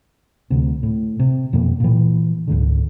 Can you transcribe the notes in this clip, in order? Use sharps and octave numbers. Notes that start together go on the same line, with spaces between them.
D2 C3
A2
C3
F2 B2 A#3
A#2 E3
C#2 G#2 D3